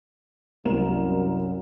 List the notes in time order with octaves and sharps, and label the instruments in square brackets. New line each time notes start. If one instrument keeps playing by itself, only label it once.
[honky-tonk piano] C2 A#4 E7 [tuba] F#2